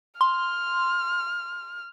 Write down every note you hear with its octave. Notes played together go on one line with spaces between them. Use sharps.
C6 F6